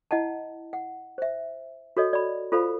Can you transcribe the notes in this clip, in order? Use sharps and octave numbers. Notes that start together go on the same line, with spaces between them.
E4 D#5 F#5 A5
F#5
C5 E5
F#4 A4 C#5 D#5
D5 B5
F4 A4 C5 F5 B5